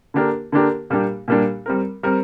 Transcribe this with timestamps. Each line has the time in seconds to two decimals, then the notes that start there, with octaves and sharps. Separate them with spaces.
0.14 D3 A#3 D4 G4 A#4
0.52 D3 A#3 D4 G4 A#4
0.90 A#2 G3 A#3 D4 G4
1.28 A#2 G3 A#3 D4 G4
1.66 G3 C4 A#4
2.03 G3 C4 A#4